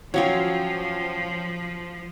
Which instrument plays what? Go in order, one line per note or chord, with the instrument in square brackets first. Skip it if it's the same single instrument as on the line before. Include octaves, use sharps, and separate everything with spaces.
[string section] F3 [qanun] F#3 C#4 F4 [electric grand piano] C#5 F5 G5